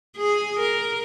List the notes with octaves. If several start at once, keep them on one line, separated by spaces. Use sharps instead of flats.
G#4
A#4